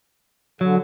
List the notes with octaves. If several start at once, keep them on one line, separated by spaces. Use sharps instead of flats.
D3 F#3